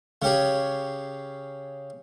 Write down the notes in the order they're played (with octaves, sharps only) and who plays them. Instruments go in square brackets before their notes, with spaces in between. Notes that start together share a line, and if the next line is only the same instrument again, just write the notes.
[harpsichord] C#3 C#4 G4 G#4